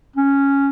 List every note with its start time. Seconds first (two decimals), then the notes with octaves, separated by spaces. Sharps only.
0.16 C#4